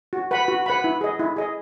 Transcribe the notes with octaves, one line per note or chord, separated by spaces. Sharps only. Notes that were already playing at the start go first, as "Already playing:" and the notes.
F#4
B4 F#5 B5
F#4
B4 F#5 B5
E4
G#4 D#5
E4
G#4 D#5